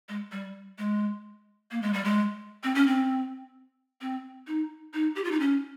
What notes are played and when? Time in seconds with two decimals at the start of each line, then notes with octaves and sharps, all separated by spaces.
0.09 G#3
0.32 G3
0.78 G#3
1.71 A#3
1.82 G#3
1.93 G3
2.04 G#3
2.63 C4
2.75 C#4
2.87 C4
4.01 C4
4.47 D#4
4.94 D#4
5.15 G4
5.24 F4
5.31 D#4
5.40 C#4